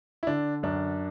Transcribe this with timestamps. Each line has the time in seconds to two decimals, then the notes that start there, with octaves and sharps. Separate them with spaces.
0.23 E4
0.27 D3 D4
0.63 F#2 D4